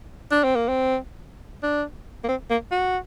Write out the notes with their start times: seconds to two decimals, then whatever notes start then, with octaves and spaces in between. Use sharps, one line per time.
0.32 D4
0.44 C4
0.56 A#3
0.68 C4
1.63 D4
2.24 A#3
2.28 C4
2.50 A#3
2.71 F#4